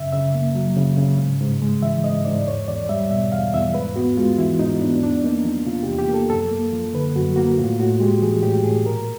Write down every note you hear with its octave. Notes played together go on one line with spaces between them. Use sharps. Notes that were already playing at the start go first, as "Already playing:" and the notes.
Already playing: F#2 C#3 E5
C#3 E5
A#3
F#3
C#3
C#3
G#2
G#2
G#3
E3 E5
G#2 D#5
G#2 D5
E2 C#5
E2 D5
G3 E5
B2 E5
E2 F5
E2 E5
G#2 B4
B3 F#4
G#3 F4
E3 E4
G#2 D#4
B3 D4
E2 D4
A#3 D#4
F3
C3 F4
G4
E2
G4
A#3
A4
F#2 A4
A#3
F3
D3 B4
F#2 F#4
A#3 F#4
A2 F4
A2 F#4
G#3 G4
E3 G#4
A2 G4
A2 G#4
A#2 A#4